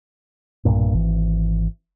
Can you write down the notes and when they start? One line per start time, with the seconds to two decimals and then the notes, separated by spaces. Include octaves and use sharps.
0.65 B1 G2 A#2
0.94 G#1 E3